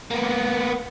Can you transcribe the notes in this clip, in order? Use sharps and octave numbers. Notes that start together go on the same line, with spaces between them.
A#3 B3